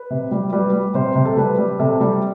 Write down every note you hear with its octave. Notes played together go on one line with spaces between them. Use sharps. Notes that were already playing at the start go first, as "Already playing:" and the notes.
Already playing: B4
C3
G3
G3 B4
G3
C3 C5
C3
A4
G3 B4
G3
C3 A4
G3